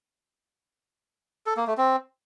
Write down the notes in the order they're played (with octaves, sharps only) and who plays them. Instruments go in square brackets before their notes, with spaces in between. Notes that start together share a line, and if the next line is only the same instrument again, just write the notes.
[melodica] A4
A#3
A3
C4